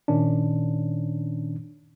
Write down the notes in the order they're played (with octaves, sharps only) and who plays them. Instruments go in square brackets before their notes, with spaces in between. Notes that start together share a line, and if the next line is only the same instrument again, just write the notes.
[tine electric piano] A#2 D#3 C#4 D4